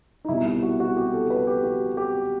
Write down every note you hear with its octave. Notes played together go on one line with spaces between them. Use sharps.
D#4
C2 B2 G3 E4
E4
F#4
F#4
G4
A4
B4
G4
F#4
G4